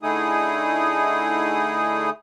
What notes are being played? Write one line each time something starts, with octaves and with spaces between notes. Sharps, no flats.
D3 A3 D#4 E4 G#4 D#6